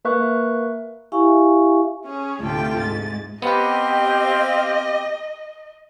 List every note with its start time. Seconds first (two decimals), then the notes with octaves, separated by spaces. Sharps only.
0.05 A#3 A#4 B4 E5 C#6 F#6
1.12 E4 G4 E5 F5 G#5 C#6
2.06 C#4 G#4 C#5
2.40 D2 A2 C3 F4 A4 G5
2.79 G#2 A6
3.42 B3 C4 G4 B4 C5 D#5 F5